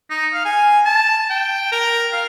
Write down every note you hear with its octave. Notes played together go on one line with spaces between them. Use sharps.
D#4
F5
G#5
A5
G5
A#4
F5